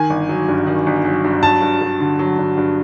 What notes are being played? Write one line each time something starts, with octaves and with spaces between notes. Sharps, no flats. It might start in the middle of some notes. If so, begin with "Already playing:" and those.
Already playing: D#3 G#5
G1
F#3
G2
D#3
G1
F#3
G2
F#3 A5
G2
G2
D3
F#3
G2
G2